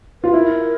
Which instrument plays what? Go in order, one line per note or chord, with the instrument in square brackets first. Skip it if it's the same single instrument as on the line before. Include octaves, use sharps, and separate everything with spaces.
[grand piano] F4 [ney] B4
[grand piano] E4 [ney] A#4